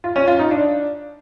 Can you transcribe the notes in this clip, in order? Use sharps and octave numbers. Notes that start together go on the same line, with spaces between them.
F4
C#4
F4
D#4
D4